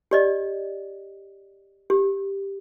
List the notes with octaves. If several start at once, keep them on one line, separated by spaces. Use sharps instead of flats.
G4 D5 D#5
G4